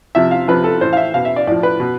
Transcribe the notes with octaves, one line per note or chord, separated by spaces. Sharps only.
C3 F3 E5
F5
C3 F3 B4
A4
A2 E3 C5
F5
E5
B2 F5
E5
D5
A2 F3 D5
B4
B2